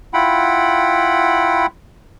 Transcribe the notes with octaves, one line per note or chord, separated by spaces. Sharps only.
E4 F4 F#5 G5 B5